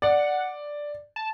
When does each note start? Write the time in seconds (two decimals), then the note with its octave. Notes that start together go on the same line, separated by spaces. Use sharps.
0.02 D5 F#5
1.16 A5